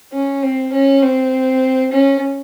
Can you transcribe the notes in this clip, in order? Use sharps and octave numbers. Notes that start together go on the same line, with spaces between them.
C#4
C4
C#4
C4
C#4